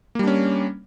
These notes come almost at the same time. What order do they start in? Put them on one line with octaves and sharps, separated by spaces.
A#3 G3 D4 C#4